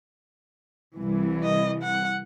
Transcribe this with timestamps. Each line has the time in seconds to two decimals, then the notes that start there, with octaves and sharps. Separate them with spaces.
0.97 C2 E3
1.43 D#5
1.83 F#5